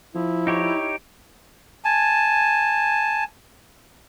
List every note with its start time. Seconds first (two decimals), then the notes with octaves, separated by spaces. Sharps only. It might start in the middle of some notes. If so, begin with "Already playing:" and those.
0.15 F3 E4
0.47 D#4 G4 C#5
1.84 G#5 A5